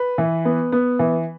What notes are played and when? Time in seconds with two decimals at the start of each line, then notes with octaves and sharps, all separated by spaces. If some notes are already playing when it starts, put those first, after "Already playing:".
Already playing: B4
0.18 E3
0.45 B3
0.72 B3
0.99 E3